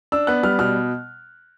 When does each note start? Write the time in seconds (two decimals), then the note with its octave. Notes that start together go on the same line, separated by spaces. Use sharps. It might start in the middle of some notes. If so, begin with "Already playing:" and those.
0.12 D4 E6
0.27 B3 F#6
0.43 G3 F6
0.59 B2 F6